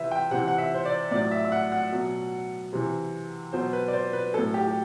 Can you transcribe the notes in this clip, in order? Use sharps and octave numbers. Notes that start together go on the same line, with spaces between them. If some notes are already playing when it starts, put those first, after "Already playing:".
Already playing: C3 E3 B4 E5
G5
C3 E3 F#5
F#5
E5
C5
D5
A2 F#3 D5
E5
E5
F#5
F#5
B2 F#3
C3 E3
B2 F#3 C5
B4
D5
C5
B4
A2 F#3 A4
G4
G4